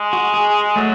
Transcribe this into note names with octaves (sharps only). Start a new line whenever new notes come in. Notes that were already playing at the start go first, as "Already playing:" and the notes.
Already playing: G#3
F#4
G#4
F#3 A3